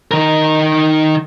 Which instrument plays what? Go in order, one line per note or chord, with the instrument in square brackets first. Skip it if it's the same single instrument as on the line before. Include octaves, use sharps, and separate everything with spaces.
[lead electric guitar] D#3 A#4